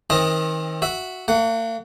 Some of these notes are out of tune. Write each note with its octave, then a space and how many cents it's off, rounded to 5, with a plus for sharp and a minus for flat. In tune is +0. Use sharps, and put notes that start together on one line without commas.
D#3 +35 C4 +40 D#5 +0
F#4 +0 E5 +0
A#3 -45 F#5 +0